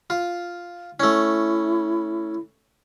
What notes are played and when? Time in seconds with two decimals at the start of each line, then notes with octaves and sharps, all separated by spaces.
0.10 F4
1.00 A3 C#4 E4